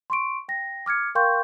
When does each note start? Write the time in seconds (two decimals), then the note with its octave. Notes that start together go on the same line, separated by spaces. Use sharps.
0.10 C6 C#6 D7
0.48 G5 A#6
0.86 D6 F6 G#6 C#7
1.15 A#4 F5 G5 C6 C#6 G6